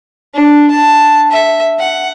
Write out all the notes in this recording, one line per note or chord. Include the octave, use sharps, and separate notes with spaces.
D4
A5
E5
F#5